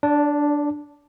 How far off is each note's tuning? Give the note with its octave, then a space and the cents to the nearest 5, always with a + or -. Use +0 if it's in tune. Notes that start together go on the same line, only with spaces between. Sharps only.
D4 +0 D5 -40